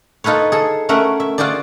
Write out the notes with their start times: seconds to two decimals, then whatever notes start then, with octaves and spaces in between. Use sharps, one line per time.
0.24 D#4 F4 A4 B4 C#5
0.52 G#4 A4
0.89 A3 C#4 A#4 E5 F#5
1.20 E5
1.38 F4 F#4 G#4 C5 D5